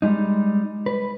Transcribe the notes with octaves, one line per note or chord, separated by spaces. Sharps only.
G3 G#3 D#4
B4